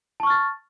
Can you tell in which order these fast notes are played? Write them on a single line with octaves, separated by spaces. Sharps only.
A5 C#6 F6 A6